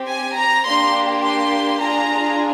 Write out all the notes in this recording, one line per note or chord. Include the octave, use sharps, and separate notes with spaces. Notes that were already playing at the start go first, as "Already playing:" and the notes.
Already playing: C4 G4
G#5
A#5
A#3 D4 G4 C6
C6
D4 F4 G#4 A#5